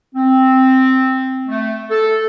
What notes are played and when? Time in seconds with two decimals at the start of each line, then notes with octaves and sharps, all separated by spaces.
0.14 C4
1.48 A3
1.90 A4